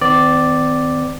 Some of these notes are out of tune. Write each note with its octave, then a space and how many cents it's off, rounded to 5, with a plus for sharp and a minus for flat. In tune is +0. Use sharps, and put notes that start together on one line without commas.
D#3 +20 C4 -40 D5 +0